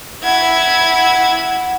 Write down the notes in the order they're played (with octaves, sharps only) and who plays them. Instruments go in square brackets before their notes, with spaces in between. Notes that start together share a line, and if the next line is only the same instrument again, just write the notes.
[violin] E4 G#6 [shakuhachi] F#5